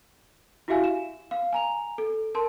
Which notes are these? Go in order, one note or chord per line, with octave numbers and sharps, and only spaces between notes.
E4 F#4 G4 E5 F5 G#5
E7
F5
G#5 A#5 F7
A4
A#4 A5 C6